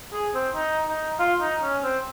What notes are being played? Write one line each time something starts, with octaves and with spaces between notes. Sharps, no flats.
G#4
C4
D#4
D#4
F4
D#4
C#4
C4